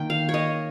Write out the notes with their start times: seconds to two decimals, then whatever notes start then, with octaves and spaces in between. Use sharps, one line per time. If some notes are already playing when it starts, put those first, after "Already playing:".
Already playing: D#3 A#3 G5
0.10 F5
0.29 C#5
0.34 D#5